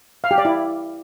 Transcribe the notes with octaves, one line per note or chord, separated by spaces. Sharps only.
F5
G4
D5
E4